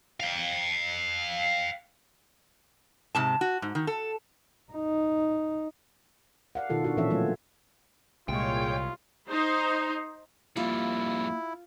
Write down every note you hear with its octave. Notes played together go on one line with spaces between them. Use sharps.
F5 G5
G#2 C3 A5
F#4
G#2
D#3
A4
D#4
D5 F5 F#5
B2 D#3 F4 A4
D4 F4 F#4
A#2 E3 F3 C#4 A4 E5
D3 F#3 A3 C4 F4 C#5
C2 A#2 G#3 F4 C#5 G5
D#4 C5
F2 G3 A#3 E4 F4